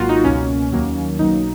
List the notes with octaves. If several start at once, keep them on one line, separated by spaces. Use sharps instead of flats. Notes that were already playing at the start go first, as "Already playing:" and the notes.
Already playing: G#1 G#2 F#3 A#3 F4 F#4
D#4
C#2 B2 A#3 C#4
D#2 D#3 F#3 A#3
B1 B2 F#3 A#3 D#4